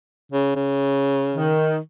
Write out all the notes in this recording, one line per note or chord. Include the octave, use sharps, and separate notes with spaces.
C#3
C#3
D#3